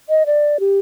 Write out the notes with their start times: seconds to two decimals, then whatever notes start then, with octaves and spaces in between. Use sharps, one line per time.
0.09 D#5
0.26 D5
0.60 G4